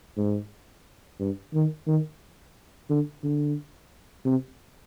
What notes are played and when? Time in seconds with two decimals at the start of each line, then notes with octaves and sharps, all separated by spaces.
0.17 G#2
1.19 G2
1.54 D#3
1.87 D#3
2.90 D3
3.23 D3
4.25 C3